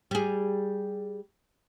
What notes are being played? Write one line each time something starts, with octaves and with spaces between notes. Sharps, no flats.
G3 G#4